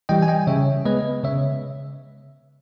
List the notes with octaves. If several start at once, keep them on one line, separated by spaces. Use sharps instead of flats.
E3 G3 D#5 G5
G#5
D#5 G5
C#3 C#5 E5
G#3 B3 B4 D#5
C#3 C#5 E5